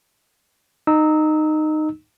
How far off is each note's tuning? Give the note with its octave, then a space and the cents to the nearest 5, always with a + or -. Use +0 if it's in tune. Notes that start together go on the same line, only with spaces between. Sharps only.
D#4 -15 E6 -30